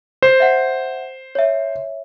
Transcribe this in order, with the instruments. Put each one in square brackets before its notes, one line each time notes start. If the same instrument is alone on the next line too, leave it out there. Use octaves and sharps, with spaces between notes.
[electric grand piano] C5
[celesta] E5 F#5
C#5 E5